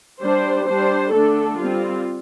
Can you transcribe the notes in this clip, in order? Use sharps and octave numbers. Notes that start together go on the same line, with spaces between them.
G3 D4 C5
G3 D4 C5
D3 A3 D4 A4
G3 C4 F4